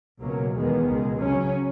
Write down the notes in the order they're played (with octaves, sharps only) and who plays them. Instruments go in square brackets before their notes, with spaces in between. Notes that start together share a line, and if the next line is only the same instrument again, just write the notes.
[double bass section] C#2 B2 F#3 A#3 C#4
E2 D#3 G#3 B3
C#2 B2 G#3
C#2 C#3 F#3 C#4